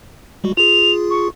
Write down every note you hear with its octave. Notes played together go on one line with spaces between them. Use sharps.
G3 G#3 F#4
F4 G#4 F7
C#6